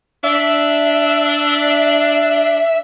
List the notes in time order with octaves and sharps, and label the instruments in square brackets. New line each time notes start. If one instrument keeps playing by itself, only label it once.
[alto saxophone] D4 [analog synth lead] E5